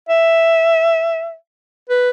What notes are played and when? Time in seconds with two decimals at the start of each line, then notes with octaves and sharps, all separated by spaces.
0.09 E5
1.89 B4